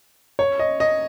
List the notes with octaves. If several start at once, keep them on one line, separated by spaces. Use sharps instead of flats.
C#5
D#5
D#5